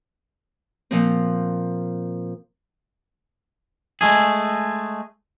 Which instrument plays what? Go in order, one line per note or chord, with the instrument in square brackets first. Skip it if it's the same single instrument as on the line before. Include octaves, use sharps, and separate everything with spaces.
[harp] A#2 F3 C4
[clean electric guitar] G#3 A3 G#4